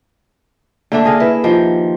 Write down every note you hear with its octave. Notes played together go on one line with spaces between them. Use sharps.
D3 A3 A#3 D4
G#4 D#5 F5
E4 B4
D#3 F3 G4